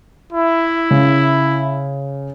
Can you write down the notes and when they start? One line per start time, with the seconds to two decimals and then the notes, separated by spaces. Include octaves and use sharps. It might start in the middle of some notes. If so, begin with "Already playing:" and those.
0.33 E4
0.91 C#3